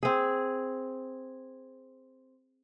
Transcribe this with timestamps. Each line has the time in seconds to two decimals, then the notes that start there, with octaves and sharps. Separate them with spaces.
0.03 C4 G#4